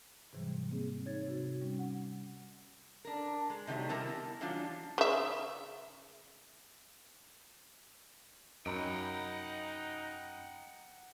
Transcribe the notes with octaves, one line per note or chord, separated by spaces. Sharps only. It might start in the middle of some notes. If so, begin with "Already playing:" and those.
G#2 C3 E3 F#3 G3
A#3 C4 G#4
D#4 C#5 G#6 A6
C3 F#4
G3 C#4
F#5
D4 A#4
G#3
C3 D#3 F#3 G3 A3
C3 G3 E4 A#4 G#5 A5
B3
E3 F#3 G3 D4 F4
C#3 E5
F#2 D#4 D#5 F#5 G5 A#5 B5